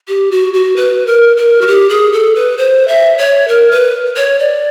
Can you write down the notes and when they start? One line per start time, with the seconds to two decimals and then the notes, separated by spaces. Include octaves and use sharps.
0.08 G4
0.31 F#4
0.54 F#4
0.76 B4
1.07 A#4
1.37 A#4
1.61 F#4
1.67 G4
1.89 G#4
2.13 A4
2.35 B4
2.58 C5
2.88 E5
3.18 C#5
3.48 A#4
3.71 B4
4.16 C#5
4.39 D5